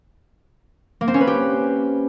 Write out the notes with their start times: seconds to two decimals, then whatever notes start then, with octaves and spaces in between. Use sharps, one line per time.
1.01 A#3
1.08 C4
1.14 C#4
1.21 B4
1.27 G4